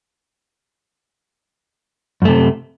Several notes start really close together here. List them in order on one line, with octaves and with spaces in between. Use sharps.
F#2 A3 C3